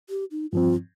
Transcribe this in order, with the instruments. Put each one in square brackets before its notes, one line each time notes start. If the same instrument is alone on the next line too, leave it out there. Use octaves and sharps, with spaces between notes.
[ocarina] G4
D#4
[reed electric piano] G2 F3 C4 [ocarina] F4